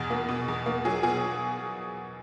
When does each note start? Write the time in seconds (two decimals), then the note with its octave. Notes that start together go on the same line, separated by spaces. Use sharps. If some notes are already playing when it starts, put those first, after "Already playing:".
Already playing: E2 B2 G#4
0.10 A#3
0.29 B2
0.48 E2
0.66 A#3
0.85 F#3 G#4
1.03 B2 G#4